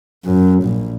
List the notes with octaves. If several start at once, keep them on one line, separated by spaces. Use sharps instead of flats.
F#2
A#1